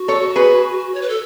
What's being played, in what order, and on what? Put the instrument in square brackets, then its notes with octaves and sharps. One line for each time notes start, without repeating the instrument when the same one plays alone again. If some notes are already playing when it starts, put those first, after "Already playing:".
Already playing: [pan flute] F#4
[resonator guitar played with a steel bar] A4 C#5
G#4 B4
[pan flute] C#5
B4
A4